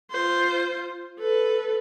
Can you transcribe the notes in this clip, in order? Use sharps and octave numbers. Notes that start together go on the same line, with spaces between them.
F4 C5
A4 B4